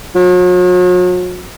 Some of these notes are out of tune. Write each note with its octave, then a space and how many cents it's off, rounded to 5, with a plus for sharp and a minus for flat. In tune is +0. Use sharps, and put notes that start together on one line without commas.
F#3 -45